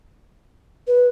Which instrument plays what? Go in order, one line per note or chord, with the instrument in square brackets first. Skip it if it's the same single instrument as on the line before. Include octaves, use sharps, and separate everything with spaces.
[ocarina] B4